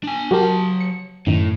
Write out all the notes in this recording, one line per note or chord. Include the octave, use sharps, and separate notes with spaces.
D4 G#5
F#3 F#4 G4 A#4 A5
C#7
F#2 A2 D#3